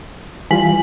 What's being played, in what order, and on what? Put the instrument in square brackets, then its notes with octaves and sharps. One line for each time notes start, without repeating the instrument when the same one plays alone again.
[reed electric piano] E3 G3 F4 [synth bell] G#5 B6 F#7